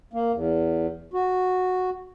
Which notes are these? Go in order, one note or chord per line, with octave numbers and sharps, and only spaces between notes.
A#3
E2
F#4